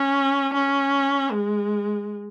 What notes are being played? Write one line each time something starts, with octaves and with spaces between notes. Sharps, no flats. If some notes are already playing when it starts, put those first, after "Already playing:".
Already playing: C#4
C#4
G#3